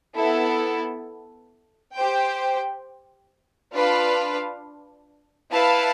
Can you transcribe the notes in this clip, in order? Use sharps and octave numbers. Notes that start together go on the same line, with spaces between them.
B3 E4 A4
G4 C5 G5
D4 F4 B4 F5
E4 B4 F5 A5